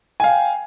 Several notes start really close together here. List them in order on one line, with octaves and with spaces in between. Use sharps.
G#5 F5 G5